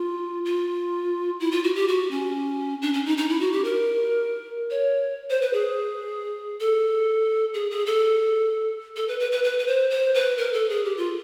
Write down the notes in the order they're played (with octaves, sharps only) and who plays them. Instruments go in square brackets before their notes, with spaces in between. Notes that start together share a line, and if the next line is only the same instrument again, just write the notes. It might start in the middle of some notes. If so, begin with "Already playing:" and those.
Already playing: [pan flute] F4
F4
E4
F4
F#4
G4
F#4
C#4
D4
C#4
D#4
D#4
E4
F#4
G4
A#4
C#5
C5
B4
G#4
A4
G#4
G#4
A4
A4
B4
B4
B4
B4
B4
C5
C5
B4
A#4
A4
G#4
G4
F4